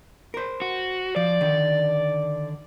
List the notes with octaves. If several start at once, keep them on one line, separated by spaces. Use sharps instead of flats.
A#4 C5
F#4
F3 D5
D3 D#3